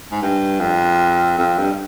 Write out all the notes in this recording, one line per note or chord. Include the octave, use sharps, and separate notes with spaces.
G#2
G2
F2
F2
G2